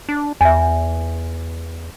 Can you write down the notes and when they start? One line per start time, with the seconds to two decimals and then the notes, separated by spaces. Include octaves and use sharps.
0.09 D4
0.41 E2 E5 G#5